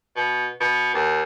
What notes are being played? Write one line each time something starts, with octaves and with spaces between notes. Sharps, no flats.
B2
B2
D#2